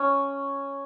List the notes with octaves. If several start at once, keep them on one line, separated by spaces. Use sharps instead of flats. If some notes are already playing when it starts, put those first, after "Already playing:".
Already playing: C#4